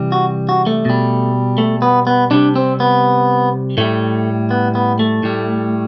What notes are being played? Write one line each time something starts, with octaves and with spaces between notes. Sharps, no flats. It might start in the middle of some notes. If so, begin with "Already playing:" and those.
Already playing: C3 E3 G3
F#4
F#4
A3
B2 G3
A3
B3
B3
C3 G3 D4
C4
B3
A2 G3 A3
B3
B3
A3
A2 G3